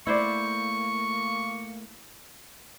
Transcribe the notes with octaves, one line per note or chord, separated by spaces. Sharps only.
A3 A#3 E4 C5 D5 C#6